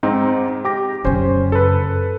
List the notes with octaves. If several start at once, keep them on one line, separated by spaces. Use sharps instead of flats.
G#2 C4 D#4
G4 D6 A#6
F#2 C#3 C#4 C5
A4 B4